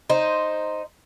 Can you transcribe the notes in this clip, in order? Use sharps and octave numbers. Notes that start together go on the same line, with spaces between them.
D#4 C5